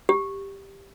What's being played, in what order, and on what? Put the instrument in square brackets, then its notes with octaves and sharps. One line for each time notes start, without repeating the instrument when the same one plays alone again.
[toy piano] G4